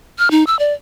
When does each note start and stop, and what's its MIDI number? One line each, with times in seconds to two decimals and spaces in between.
0.19 0.29 89
0.31 0.44 63
0.47 0.58 88
0.59 0.73 74